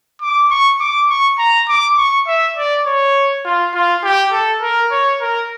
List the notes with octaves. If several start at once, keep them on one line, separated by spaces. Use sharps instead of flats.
D6
C#6
D6
C#6
A#5
D6
C#6
E5
D5
C#5
F4
F4
G4
A4
A#4
C#5
A#4